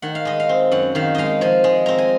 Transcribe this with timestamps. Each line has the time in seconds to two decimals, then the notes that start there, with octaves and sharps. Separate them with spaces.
0.02 D#3 F#5
0.15 F5
0.25 G#3 D#5
0.40 F5
0.49 C4
0.71 F#2 F#5
0.95 D#3 F5
1.15 G#3 D#5 F5
1.41 F3 G#5
1.64 G#3
1.86 C4 A#5
1.98 G#5